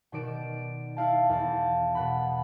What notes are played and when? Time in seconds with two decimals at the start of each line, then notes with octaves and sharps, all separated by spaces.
0.12 B2 D#3 D5 D7 E7
0.97 E4 F5 A5
1.29 E2 F5 A5
1.95 B2 F#5 B5